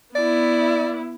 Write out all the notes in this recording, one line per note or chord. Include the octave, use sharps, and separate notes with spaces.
B3 E4 D5